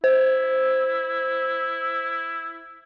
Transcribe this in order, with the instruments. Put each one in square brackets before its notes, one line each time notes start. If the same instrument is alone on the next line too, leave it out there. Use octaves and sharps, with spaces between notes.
[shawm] E4 [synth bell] C5